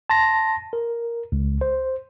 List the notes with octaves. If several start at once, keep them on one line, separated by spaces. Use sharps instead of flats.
A5 C6 A#6
A#4
C#2
C5